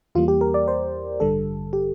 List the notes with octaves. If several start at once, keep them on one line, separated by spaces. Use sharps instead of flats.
E2 E3 G3 A#3 F4
G4
A#4
D5
C5
A1 G2 D3 G3 A4
G4